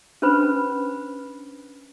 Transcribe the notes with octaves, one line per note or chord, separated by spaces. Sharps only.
C#4 D4 B4 C5 B5